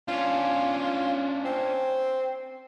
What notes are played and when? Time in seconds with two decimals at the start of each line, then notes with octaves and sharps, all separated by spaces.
0.08 C#4 D4 F4
1.45 C4